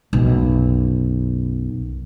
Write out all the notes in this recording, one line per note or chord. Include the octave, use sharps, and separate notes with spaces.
B1 F#2